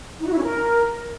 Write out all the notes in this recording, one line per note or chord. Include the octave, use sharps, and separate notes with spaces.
D#4
F#4
E4
C#4
A#4